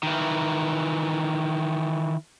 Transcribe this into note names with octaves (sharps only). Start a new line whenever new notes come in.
D#3 E3